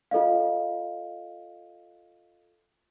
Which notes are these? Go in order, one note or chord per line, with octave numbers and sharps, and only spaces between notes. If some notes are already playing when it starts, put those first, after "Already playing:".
F4 A4 D#5 F5